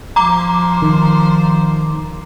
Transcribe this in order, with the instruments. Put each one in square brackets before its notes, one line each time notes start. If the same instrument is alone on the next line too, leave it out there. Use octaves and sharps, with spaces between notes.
[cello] F3 C5 [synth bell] A#5 D6
[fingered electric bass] D#3